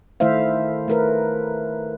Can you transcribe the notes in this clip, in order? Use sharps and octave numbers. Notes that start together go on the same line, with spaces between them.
D#3 A3 E4 C5 E5 F5
A3 A#4 B4